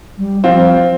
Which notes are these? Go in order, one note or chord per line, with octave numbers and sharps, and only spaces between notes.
G3
F3 C4 F4